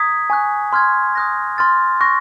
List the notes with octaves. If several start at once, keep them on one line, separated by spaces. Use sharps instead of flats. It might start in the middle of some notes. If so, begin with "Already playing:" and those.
Already playing: A#5 D#6 G#6 B6
G#5 C#6 F#6
C6 F6 G#6
D#6 F#6 A#6
C6 F6 A6
C#6 F#6 A#6